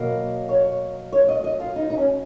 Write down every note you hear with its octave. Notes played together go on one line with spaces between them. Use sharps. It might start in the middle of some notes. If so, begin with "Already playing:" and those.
Already playing: B2 F#3 A#3
C#5
C#5
D#5
D#5
F4
D#4
D#4
C#4